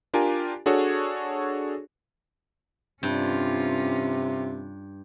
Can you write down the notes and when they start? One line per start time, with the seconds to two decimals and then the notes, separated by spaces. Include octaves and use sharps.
0.13 D4 F4 G4 A#4 G#5
0.66 D4 F#4 G#4 A4 C#5
3.03 G2 C3 C#4 F4